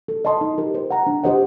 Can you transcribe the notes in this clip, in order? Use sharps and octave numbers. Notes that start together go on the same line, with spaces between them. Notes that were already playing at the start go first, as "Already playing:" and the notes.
A4
D#5 A5 C6
D#4
G4 A#4
C5
F#5 A#5
D4
G4 C5 D#5 F#5